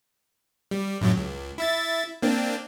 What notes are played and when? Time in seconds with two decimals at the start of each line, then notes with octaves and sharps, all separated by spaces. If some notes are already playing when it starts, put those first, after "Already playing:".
0.71 G3
1.01 F#2 A2 F#3
1.17 C#2
1.58 E4 E5 A6
2.22 A#3 C4 D4